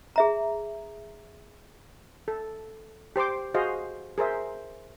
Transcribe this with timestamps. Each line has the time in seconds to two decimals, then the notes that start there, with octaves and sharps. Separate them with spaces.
0.16 G#4 E5 A#5
2.28 A4
3.16 G4 C5 C6 D6
3.54 F#4 G#4 C5 D#5 F5
4.18 G#4 A#4 C5 E5